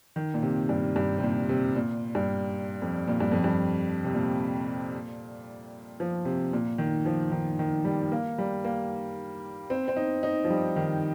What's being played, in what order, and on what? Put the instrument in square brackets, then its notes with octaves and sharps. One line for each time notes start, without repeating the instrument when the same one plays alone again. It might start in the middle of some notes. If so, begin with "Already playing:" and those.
[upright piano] D#3
A#2
C3
G2
G2
C3
A#2
C3
A#2
G2
F2
A#2
G2
F2
G2
C3
A#2
F3
C3
A#2
D#3
F3
D#3
D#3
G3
A#3
G3
A#3
C4
C4
D#4
D#4
F3
G3
D#3